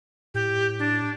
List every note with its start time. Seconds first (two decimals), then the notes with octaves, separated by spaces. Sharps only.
0.34 A2 G4
0.79 D4